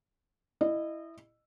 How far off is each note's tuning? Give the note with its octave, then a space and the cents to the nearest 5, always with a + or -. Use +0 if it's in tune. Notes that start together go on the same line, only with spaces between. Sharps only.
E4 +0 D#5 -25